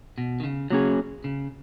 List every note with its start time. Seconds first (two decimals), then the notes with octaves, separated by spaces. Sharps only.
0.18 B2
0.40 D#3
0.44 C#3
0.70 C#3 F#3 A#3 C#4 G#4
1.24 C#3